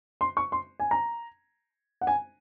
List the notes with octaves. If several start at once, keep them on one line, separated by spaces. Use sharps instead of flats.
C6
C#6
C6
G#5
A#5
F#5
G#5